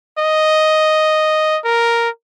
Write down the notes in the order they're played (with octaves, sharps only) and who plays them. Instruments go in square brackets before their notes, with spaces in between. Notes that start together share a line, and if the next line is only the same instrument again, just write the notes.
[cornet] D#5
A#4